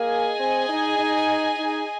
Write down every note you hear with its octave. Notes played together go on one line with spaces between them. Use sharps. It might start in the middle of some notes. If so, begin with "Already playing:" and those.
Already playing: A#3 G#4 D#5 G#5
C4
D#4
D#4
D#4